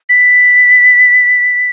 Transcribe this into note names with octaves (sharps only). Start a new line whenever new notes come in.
B6